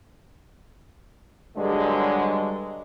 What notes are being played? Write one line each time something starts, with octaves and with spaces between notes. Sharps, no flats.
G2 D3 F#3 G#3